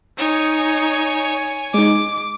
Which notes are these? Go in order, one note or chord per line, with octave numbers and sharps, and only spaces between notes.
D#4 C#5 G#5
G#3 D#4 D6